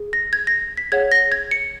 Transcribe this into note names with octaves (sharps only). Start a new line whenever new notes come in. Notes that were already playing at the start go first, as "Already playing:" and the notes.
Already playing: G#4
A#6
G#6
A#6
B6
G#4 C#5 F#5 G#6
A#6
G#6
C#7